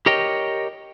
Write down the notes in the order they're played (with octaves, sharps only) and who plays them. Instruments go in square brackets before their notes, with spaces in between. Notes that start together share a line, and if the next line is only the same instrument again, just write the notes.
[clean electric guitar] G4 A#4 C#5 D#5 G5